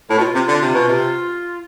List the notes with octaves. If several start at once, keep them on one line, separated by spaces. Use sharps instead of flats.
A2
B2 F4
C3
D3
C3
B2
C3